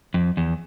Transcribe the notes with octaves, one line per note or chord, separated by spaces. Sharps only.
F2
E2